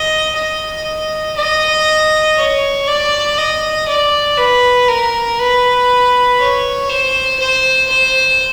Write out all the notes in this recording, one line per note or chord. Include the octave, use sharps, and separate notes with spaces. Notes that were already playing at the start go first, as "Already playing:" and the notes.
Already playing: D#5
D#5
D#5
C#5
D5
D#5
D5
B4
A#4
B4
C#5
C5
C5
C5